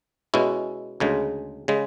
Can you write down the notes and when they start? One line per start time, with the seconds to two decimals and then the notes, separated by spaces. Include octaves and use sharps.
0.34 B2 G#3 C#4 E4
1.00 D2 C#3 G#3
1.68 C#3 G#3